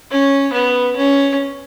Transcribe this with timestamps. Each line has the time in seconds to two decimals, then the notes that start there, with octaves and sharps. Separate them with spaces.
0.11 C#4
0.53 B3
0.96 C#4